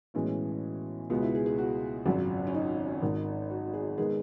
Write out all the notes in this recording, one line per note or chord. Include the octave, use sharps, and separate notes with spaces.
B1 A2 E3 G#3 C#4
C#2 B2 G#3 B3
E4
G#4
G#4
F#4
G#1 F#2 C#3 F#3
C#4
D#4
G#1 G#2 D#3
F#4
G#4
D#3 G#3 B3 G#4